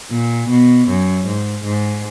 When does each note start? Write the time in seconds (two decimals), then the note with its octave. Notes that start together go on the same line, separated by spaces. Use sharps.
0.11 A#2
0.50 B2
0.88 F#2
1.27 G#2
1.65 G#2